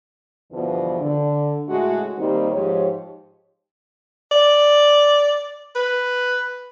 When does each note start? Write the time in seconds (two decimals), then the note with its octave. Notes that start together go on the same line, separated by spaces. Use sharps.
0.51 E2 G2 B2 D3 E3 F3
0.99 D3
1.67 A2 C#3 G#3 A3 F#4
2.16 D#3 G3 A#3 C4 D#4 G4
2.50 G#2 F3 G4 C#5
4.31 D5
5.76 B4